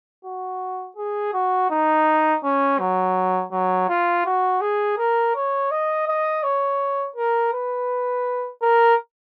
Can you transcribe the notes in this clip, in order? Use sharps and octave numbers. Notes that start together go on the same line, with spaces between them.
F#4
G#4
F#4
D#4
C#4
F#3
F#3
F4
F#4
G#4
A#4
C#5
D#5
D#5
C#5
A#4
B4
A#4